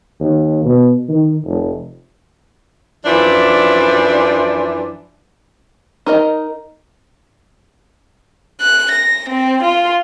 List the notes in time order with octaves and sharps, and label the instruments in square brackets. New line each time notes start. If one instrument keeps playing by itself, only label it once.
[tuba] D#2
B2
D#3
F1
[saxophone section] F#2 E3 F3 D4 E4 D5
[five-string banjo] D#4 A#4 D#5
[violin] F#6
A#6
C4
F4